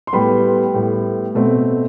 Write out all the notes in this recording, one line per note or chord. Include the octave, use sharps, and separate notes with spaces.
C6
A2 G3 B3 B5
A2 G3 B3
B2 A3 C4